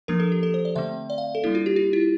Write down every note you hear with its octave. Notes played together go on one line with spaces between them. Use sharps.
F3 A#3 D4 A#4
A4
G4
A4
C5
D5
D3 A3 C4 E5
D5
F5
A4
G3 A#3 D4 E4
F4
G4
F4
E4